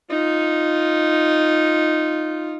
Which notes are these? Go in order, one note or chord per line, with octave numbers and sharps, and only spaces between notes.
D#4 F4